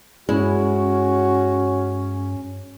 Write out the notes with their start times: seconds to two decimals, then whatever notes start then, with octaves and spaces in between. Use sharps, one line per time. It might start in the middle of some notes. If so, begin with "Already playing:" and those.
0.29 G2 G#3 C#4 E4 F#4